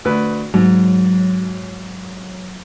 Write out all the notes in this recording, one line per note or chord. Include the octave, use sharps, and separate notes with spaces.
D2 B4
G#2 F#3